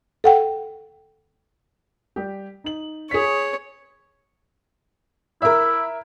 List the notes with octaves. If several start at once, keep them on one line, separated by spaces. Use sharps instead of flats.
A4 F#5 G5
G3 G4
D#4 F#7
G#4 C#5 B6
E4 A#4 E5